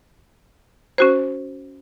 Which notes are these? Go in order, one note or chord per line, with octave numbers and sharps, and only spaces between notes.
C#4 F#4 C5